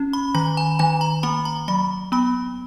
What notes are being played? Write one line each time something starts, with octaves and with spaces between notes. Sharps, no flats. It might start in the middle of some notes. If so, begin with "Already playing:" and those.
Already playing: C#4
B5
D#3 A#5
G#5
D#3 G#5
A#5
A#3 B5
A#5
F#3 B5
B3 B5